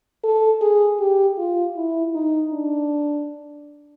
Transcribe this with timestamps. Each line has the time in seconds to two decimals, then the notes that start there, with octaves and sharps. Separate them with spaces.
0.24 A4
0.61 G#4
0.99 G4
1.38 F4
1.76 E4
2.14 D#4
2.53 D4